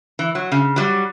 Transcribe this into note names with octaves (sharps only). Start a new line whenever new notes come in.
E3
F#3
C#3
F#3 G3